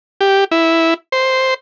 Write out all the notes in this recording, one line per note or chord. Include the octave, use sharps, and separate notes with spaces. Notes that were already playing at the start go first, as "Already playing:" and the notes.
G4
E4
C5